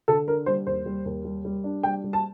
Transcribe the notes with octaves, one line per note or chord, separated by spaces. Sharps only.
D3 A4
D4 A#4
G3 C5
D#2 C5
G3
D#2
G3
G3
D4
G3 G5
G3
A5